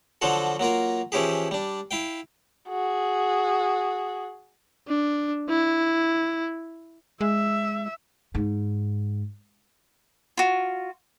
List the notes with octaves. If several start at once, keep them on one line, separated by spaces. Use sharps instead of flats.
D3 F3 F#3 F4 F#4 A4
F#3 A#3 F4 A#4
E3 F3 C#4 E4 G4 G#4
G3 D4
E4 F5 G5
F#4 G#4
D4
E4
G#3 E5
G#2
F4 F#4